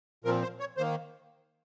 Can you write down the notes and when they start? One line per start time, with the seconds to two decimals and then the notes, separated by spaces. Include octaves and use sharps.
0.24 A#2 F3 C4 A#4
0.42 C5
0.60 C#5
0.77 D#3 A#3 C5